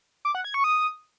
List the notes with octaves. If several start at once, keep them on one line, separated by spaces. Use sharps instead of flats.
D6
F#5
G#6
C#6
D#6